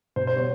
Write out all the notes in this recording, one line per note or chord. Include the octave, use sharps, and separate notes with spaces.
B2 C5
C5
G3 B3 C#5